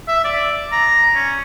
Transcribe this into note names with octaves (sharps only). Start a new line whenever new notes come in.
E5
D5
A#5
C#4